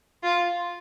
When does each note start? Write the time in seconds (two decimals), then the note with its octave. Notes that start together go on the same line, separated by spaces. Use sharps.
0.23 F4